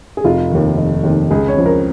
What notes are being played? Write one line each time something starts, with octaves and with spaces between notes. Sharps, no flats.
G#4
F1 F4
D#2 D#3
F1
D#2 D#3
C#2 G#4
C#5
C#3 F3
A#4